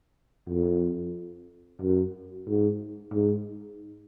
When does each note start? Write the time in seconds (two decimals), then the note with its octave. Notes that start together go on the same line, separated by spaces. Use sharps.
0.49 F2
1.82 F#2
2.48 G#2
3.13 G#2